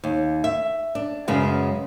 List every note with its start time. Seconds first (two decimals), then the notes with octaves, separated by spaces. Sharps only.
0.04 D#2
0.44 E5
0.95 D4
1.28 F#2 C#3 G#3 B3